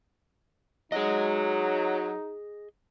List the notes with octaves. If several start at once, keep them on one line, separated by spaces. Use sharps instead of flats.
F#3 D#4 G#4 D#5